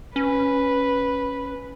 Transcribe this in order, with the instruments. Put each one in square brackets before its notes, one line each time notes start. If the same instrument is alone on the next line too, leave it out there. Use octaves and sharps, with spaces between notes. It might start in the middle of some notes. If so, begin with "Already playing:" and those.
[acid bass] C#4 [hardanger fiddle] B4